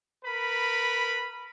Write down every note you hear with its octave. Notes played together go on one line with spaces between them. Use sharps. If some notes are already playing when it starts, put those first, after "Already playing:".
A#4 B4 B5